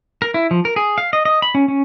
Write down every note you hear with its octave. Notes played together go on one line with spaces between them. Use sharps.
A#4
E4
F3
A#4
G#4
F5
D#5
D#5
B5
C#4
C#4